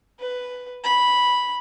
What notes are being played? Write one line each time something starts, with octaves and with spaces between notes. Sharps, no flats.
B4
B5